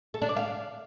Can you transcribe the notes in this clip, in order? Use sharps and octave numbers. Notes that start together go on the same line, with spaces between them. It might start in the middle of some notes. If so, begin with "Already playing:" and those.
A4
D4
D5
F5